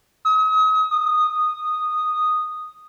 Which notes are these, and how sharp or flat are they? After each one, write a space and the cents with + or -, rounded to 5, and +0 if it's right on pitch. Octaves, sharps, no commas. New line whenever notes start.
D#6 +40
D#6 -10